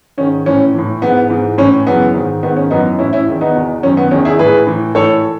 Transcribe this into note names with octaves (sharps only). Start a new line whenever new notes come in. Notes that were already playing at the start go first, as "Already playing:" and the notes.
G#2 D#3 C#4
A2 E3 C#4
A2 E3
G#2 E3 B3
G#2 E3
A2 E3 C#4
F#2 C#3 E3 B3
G#2 D#3
G#2 D#3 B3
C#4
F#2 E3 B3 D#4
A2 E3 C#4 E4
C#4 E4
E2 D#3
B3 D#4
E2 B2
F#2 D#3 C#4
B3
E2 D#3 C#4
E4 G#4
A2 E3 G#4 B4
A2 E3
A2 E3 A4 C#5